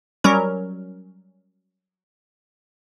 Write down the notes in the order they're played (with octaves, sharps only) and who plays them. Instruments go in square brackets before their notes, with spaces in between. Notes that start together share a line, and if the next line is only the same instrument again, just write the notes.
[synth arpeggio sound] F#3 G3 C#4 A#4